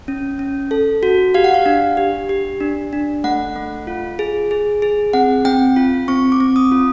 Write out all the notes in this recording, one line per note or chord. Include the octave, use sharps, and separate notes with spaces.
C#4
C#4
A4
F#4
G4 F5
F#5
F5
D4
G4
G4
D4
D4
A3 F#5
A3
F4
G#4
G#4
G#4
C4 F#5
C4 G5
F4
C4 C#6
D6
C4
D#6
F4